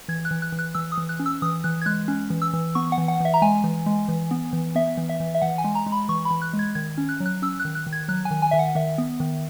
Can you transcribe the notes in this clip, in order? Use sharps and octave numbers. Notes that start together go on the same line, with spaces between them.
E3 G#6
F#6
E3
F#6
E3
F#6
E3 E6
D#6
E3
F#6
C#4
E6
E3 D#6
E3 F#6
G#6
G#3 F#6
C#4
E3
E6
E3
B3 C#6
F#5
E3
F#5
E3 E5
A#5
G#3 G#5
E3
G#3
E3
B3
E3
B3 E5
E3
E5
E3
E5
E3 F#5
G#5
G#3
A#5
G#3
B5
E3 C#6
B5
E3
F#6
G#3
G#6
D#3 G#6
C#4
F#6
F#3
F#6
C#4 E6
F#6
D#3
F#6
D#3
G#6
F#3 F#6
G#5
D#3
G#5
D#3 E5
F#5
D#3 E5
B3
D#3